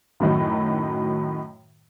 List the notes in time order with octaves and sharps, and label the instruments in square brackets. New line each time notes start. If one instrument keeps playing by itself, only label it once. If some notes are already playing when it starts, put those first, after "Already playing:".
[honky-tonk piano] F#2 A2 D#3 F#3